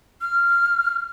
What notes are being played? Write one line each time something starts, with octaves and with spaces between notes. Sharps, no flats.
F6